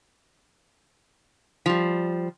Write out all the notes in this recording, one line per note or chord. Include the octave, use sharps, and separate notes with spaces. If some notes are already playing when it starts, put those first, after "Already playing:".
F3 G3